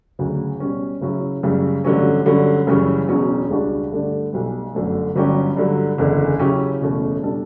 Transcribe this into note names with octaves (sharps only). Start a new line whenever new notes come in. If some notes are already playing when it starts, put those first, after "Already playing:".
D2 C#3 F#3
B2 G3 C#4
C#3 F#3 C#4 E4
F#2 C#3 G3
A1 G2 D3 F#3 C#4
G2 D3 F#3 C#4
F#2 C#3 E3 G3 C#4
E1 E2 B2 F#3 C#4
C#2 C#3 G3 D4 F#4
G2 D3 A3 D4
B1 B2 G3
G1 F#2 D3 A3
G1 G2 F#3 C#4 G4
G2 D3 F#3
F#1 E2 D3
C#3 F#3 C#4 E4 G4
F#1 E2 B2 A3 C#4
B2 G3 D4 A4